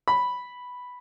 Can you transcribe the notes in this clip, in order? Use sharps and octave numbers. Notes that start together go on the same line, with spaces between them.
B5